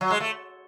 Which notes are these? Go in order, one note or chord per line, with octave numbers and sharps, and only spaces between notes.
F#3
G#3
A3